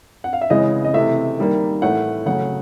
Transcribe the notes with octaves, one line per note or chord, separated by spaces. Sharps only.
F#5
F5
E5
C#3 E3 G#3 D#5
D#5
C3 E3 A3 E5
D#3 G3 A#3
A2 E3 A3 F#5
C#3 F#3 A3 F#5